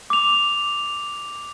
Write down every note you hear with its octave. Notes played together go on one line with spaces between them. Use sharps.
D6 F7